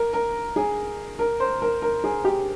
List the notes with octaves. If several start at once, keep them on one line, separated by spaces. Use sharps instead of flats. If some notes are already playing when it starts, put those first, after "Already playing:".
Already playing: A#4
A#4
G#4
A#4
C5
A#4
A#4
G#4
G4